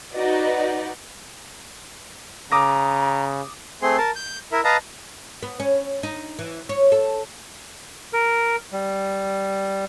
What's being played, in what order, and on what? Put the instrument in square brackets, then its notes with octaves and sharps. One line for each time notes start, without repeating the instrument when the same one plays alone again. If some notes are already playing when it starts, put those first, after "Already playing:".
[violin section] D#4 F#4 B4 D5 D#5
[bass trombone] C#3 [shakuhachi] A#5 [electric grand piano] D6 D#6 A#6
[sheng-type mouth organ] A3 C4 G#4 C6
A#4 A5
G6
E4 A#4 E5
B4 D#5 F5 A5 A#5
[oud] B3
C#4
D#4
E3
C#5
A4
[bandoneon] A#4
G3